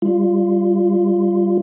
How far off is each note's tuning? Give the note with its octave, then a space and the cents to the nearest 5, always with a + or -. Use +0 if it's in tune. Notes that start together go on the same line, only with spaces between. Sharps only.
G3 +0 F4 -10